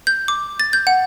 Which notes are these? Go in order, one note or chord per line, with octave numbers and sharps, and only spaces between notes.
G6
D6
A6
G6
F#5